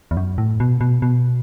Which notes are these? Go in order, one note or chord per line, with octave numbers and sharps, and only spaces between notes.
E2
F#2
A2
B2
B2
B2